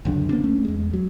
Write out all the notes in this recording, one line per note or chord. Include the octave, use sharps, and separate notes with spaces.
C#2 F#2 D3 D4
A#3 C4 D4
A3 C#4
E2 G#3
F#3